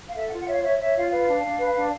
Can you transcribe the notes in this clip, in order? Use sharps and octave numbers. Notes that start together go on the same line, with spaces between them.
F5
A4 E5
F#5
F4
F#5
C#5 E5 F5
C#5 E5
C#5 E5
F4 F5
B4 F5
D4
D4
B4
D4